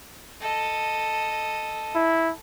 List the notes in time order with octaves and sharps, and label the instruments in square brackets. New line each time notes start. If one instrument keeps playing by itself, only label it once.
[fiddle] A4 D#5
[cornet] E4